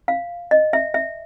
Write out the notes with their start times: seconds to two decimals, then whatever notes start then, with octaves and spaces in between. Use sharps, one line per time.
0.08 F5
0.51 D#5
0.73 E5
0.94 E5